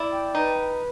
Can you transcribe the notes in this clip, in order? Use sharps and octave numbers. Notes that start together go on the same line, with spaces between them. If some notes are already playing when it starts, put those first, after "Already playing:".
Already playing: E4 D5
G5
D#4 B4